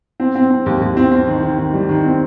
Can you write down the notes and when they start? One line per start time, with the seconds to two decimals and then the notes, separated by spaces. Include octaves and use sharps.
0.20 C4
0.35 C4
0.50 C4
0.66 D#2
0.81 D#2
0.97 C4
1.11 C4
1.27 D#3
1.43 D#3
1.58 D#3
1.74 G3
1.89 D#3
2.04 C4